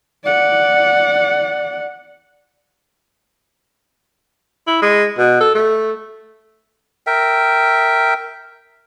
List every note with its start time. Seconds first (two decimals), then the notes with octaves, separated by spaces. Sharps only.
0.24 D5 F#5
4.67 E4
4.82 G#3
5.18 B2
5.41 A4
5.55 A3
7.07 A#4 E5 G5